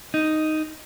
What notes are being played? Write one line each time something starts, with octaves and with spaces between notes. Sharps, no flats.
D#4